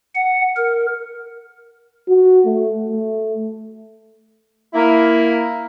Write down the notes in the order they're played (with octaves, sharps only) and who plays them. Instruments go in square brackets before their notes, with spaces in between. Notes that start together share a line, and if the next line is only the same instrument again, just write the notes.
[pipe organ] F#5
A#4
[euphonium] F#4
A3
A3
[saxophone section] A#3 E4